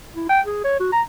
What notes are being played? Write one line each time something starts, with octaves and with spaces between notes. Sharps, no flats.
E4
G5
G#4
C#5
F#4
A#5